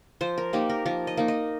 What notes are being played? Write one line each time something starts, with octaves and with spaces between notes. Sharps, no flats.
F3 C5
A#4
A#3 D#4 G4
A#4
F3 A#4
D#5
A#3 D#4
D#5